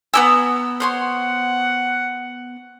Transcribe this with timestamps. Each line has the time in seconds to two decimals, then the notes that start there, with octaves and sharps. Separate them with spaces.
0.14 B3 G4 G#5 A#5 E6
0.80 C5 C#5 F#5 C6